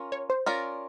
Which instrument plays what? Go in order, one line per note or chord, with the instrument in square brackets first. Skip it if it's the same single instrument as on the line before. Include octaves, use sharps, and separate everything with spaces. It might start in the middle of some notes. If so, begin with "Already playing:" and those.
Already playing: [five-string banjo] C#4 F4 A#4
[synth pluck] C#5
C5
[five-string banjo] C#4 F4 A#4 D5